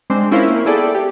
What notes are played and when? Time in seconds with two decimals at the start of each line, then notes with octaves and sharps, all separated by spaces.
0.10 G#3 C4 D4 C5
0.31 C#4 E4 F4 A#4 C5
0.48 A#3
0.65 B3 E4 G#4 A4 D5 G5
0.95 G4